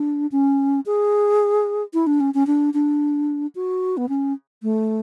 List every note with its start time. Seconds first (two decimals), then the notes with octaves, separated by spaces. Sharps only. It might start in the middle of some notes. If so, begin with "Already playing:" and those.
Already playing: D4
0.32 C#4
0.86 G#4
1.94 E4
2.07 D4
2.20 C#4
2.34 C#4
2.47 D4
2.74 D4
3.55 F#4
3.97 B3
4.09 C#4
4.63 A3